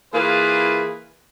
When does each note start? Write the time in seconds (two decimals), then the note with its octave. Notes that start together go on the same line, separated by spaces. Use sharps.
0.14 E3 A#3 F4 G#4 B4